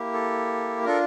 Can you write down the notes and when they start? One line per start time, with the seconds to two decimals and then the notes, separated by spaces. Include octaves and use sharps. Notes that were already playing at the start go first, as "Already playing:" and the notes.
Already playing: A#3 E4 G4
0.14 A4
0.85 D4 F4 A4 A#4